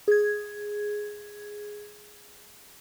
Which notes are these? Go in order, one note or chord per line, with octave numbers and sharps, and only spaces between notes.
G#4 G#6